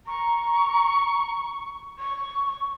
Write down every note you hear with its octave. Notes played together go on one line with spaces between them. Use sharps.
A#5 C#6
C#6